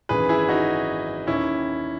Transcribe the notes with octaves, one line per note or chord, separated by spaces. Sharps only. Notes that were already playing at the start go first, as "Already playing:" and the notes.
G#1 F#2 E3 G#4 B4
E4 G#4
D#4 F#4
D#2 D#3 C#4 E4